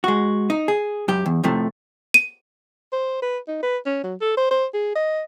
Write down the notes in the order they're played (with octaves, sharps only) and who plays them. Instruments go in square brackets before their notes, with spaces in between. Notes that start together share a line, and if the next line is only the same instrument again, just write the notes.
[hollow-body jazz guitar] G#3 F#4
D#4
G#4
F#2 G4
E2
F2 A2 C3 F3 A3
[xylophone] D#7
[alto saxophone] C5
B4
D#4
B4
C#4
F#3
A4
C5
C5
G#4
D#5